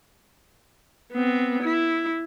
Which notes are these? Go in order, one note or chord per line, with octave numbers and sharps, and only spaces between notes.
B3 C4
E4